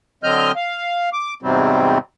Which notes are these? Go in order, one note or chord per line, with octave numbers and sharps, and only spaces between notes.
D3 F#3 C4 D#5 F6 G6
F5
D6
E2 G#2 C3 F#3 G3 C4